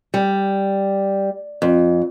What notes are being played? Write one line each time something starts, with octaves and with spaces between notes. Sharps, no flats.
G3
F2